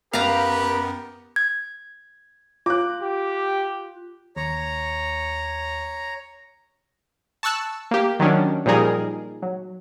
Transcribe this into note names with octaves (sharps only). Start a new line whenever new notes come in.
F#2 B3 G4 A#4 B4 F5 A#5
G#6
F4 D6 F#6
G4
D#2 C#5 A#5
A5 C#6 E6 F#6
A#3 G4
D#3 F#3 C#4 D4
A#2 F3 G3 D#4 G#4 A#4
F#3